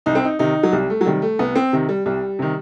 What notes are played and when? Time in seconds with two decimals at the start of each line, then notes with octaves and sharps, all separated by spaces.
0.06 C2 D#4
0.15 C4
0.25 D#4
0.39 C3 D#3 D#4
0.63 F#3
0.72 C2 G3
0.90 A3
1.01 F#3
1.06 C3 D#3 G3
1.22 A3
1.39 C2 B3
1.56 C4
1.73 C3 D#3
1.89 G3
2.06 C2 G3
2.39 C3 D#3